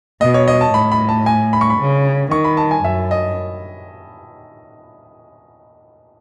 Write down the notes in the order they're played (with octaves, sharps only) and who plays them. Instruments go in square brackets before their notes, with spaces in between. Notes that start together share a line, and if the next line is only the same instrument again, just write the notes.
[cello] B2 [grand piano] D#5
[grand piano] C#5
D#5
A5
[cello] A2 [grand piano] B5
[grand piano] B5
A5
G#5
B5
C#6
B5
[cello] C#3
[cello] D#3 [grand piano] C#6
[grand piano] B5
A5
G#5
[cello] F#2 [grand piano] E5
[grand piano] D#5